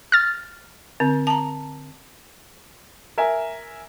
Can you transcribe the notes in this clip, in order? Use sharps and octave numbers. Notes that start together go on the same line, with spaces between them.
F6 A6
D3 C4
A5 A#5
A#4 E5 G#5